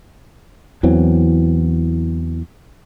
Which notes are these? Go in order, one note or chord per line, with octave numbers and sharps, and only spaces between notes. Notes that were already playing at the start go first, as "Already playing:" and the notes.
E2 E3 F#3 C4